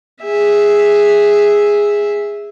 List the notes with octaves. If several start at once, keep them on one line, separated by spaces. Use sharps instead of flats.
G#4 E5